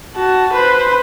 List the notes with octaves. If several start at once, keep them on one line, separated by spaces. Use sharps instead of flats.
F#4 A5
B4 C5